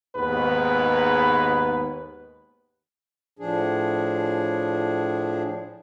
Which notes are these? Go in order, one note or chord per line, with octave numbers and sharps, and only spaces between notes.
D#2 G#2 G#3 B3 B4
A2 F3 D4 G#4